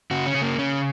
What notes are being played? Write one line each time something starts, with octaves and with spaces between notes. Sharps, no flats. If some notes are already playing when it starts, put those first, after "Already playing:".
C#3 F#4
C#4
C#3
A#3
C#3 C#4